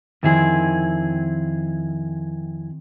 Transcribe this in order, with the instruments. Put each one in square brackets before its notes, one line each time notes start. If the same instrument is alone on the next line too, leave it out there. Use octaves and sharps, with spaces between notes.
[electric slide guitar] F2 E4 G#4 [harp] D#3 C4